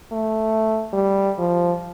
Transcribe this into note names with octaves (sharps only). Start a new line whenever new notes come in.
A3
G3
F3